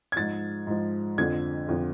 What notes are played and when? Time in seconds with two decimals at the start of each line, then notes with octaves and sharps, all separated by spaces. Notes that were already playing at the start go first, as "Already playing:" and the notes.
0.12 G#6
0.16 G#2 F3 A6
0.67 G#2 F3
1.18 F2 D3 F3 G#6
1.69 F2 D3 F3